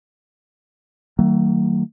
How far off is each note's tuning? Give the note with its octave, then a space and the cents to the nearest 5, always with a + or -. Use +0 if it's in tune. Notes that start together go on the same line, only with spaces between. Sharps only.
D#3 +0 F#3 +30 A#3 -45